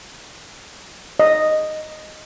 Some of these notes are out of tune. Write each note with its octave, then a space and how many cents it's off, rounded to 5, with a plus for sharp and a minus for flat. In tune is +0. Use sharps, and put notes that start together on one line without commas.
D#5 -5